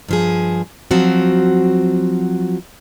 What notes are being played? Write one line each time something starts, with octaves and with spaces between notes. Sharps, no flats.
G2 F3 G#4
F3 F#3 C4 F#4